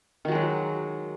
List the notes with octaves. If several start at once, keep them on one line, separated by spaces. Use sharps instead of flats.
D#3 F#3 G#3 F#4